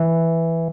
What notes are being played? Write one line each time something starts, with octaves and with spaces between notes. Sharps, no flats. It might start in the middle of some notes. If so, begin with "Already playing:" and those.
Already playing: E3